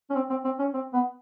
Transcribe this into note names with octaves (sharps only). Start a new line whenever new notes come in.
C#4
C4
C4
C4
C#4
C4
B3